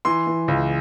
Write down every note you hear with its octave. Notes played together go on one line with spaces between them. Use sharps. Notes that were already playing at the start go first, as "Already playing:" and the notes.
E3 C6
E3
C#2